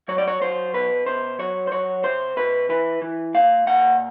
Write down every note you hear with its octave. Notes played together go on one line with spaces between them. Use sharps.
F#3 C#5
D5
C#5
F#3 C5
B2 B4
B2 C5
F#3 C#5
C5
F#3 C#5
C3 C5
C3 B4
E3 B4
E3
A#2 F5
A#2 F#5